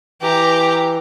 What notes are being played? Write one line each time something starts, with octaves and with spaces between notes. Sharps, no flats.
E3 G4 A#5